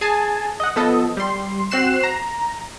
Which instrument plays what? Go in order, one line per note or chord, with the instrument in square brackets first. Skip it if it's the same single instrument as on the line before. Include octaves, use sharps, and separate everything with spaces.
[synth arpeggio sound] G#4 G#5 A5
D#5 F#5
F3 B3 A4 D#5
G3 C6
C4 F#4 F#6 C7 E7
A#5